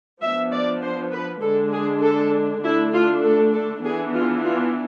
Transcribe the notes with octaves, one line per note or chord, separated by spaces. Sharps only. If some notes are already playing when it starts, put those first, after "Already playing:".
F3 B3 D4 E5
D5
C5
B4
D3 G#3 D4 A4
G#4
A4
D3 A3 D4 E4
F4
A4
A4
E3 B3 D4 G#4
F4
F4